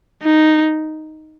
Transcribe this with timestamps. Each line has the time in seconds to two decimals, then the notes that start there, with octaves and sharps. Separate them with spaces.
0.22 D#4